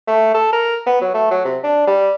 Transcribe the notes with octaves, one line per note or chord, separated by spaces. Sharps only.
A3
A4
A#4
B3
F#3
A3
F#3
C3
D4
G3